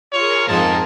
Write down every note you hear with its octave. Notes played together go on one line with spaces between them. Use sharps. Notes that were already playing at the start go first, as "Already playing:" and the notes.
F4 G#4 A#4 C#5
F2 G#2 F3 D#4 A5